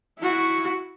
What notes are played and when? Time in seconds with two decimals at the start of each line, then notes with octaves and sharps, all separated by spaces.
0.19 E4 F#4